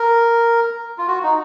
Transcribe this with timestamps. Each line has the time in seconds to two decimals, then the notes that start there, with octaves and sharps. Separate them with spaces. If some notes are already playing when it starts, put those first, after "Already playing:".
Already playing: A#4
0.98 F4
1.08 F#4
1.23 D#4